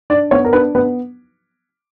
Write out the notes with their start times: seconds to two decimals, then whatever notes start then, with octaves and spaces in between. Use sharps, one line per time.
0.10 D4 D5
0.31 B3 C#5
0.45 A#4
0.53 D4 B4
0.75 B3 B4